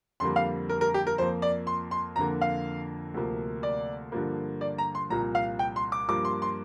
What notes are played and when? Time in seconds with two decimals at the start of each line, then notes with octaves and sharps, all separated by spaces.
0.20 F2 D3 G3 A#3 C6
0.36 F5
0.69 A#4
0.81 A#4
0.94 G4
1.07 A#4
1.18 F2 F3 A#3 C5
1.42 D5
1.67 C6
1.91 C6
2.16 F2 D3 A#3 A#5
2.41 F5
3.14 D2 C3 F3 A#3
3.63 D5
4.12 G2 D3 F3 A#3
4.61 D5
4.78 A#5
4.95 C6
5.10 C2 A#2 F3 A#3 A#5
5.35 F5
5.59 G5
5.76 C6
5.92 D6
6.08 G2 F3 A#3 D6
6.25 C6
6.42 C6